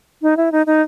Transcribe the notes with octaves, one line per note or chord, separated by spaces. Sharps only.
D#4
E4
D#4
D#4